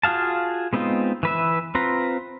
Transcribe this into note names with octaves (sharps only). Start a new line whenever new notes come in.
F4 F#4 G#4 F5 A5
G#3 B3 C4 D#4 F4
E3 B4 E5
C4 F4 B4 A#5